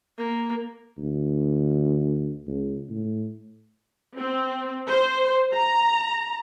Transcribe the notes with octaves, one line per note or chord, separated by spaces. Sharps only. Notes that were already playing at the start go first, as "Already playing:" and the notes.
A#3
D2
C#2
A2
C4
C5
A#5